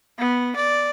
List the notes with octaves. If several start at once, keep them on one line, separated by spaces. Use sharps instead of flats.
B3
D5